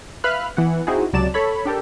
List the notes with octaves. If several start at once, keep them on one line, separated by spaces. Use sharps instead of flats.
B4 E5 F5 B5 F6 F#6
E3 B3 F#5
C4 D#4 E4 F#4 G#4
C#2 C3 F#3 D5 A5 E7
A4 C#5 B5
D4 G4 A4 A#4